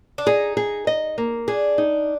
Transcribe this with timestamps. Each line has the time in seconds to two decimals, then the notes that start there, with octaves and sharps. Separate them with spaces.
0.18 D4
0.27 D#4 G#4
0.57 G#4
0.87 D#5
1.18 A#3
1.48 D4 G#4
1.78 D#4